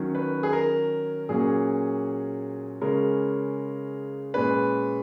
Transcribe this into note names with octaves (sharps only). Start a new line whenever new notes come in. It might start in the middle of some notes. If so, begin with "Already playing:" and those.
Already playing: D#3 F#3 C#4
B4
G#4
A#4
A#2 F#3 A#3 C#4 G#4
C#3 G#3 C#4 A#4
A#2 G#3 C#4 B4